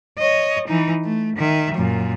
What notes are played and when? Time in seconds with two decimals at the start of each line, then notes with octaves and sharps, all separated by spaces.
0.18 C#5 D#5
0.67 E3 D#4
1.04 A3
1.36 D#3 E5
1.74 F#2 A#2